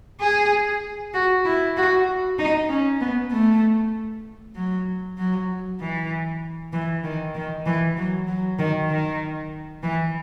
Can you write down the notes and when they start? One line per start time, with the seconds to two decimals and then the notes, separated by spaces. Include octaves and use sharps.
0.21 G#4
1.14 F#4
1.45 E4
1.77 F#4
2.38 D#4
2.69 C#4
3.01 B3
3.31 A3
4.56 F#3
5.18 F#3
5.80 E3
6.73 E3
7.04 D#3
7.35 D#3
7.66 E3
7.97 F#3
8.28 F#3
8.59 D#3
8.91 D#3
9.83 E3